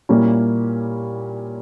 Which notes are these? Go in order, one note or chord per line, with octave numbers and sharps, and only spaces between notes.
A#2 G3 A#3 C#4 E4